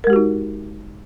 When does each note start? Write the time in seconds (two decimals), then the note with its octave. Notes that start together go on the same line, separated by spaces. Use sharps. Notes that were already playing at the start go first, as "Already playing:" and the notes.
0.04 A#4
0.07 G#3
0.10 G4
0.13 F#4
0.16 D#4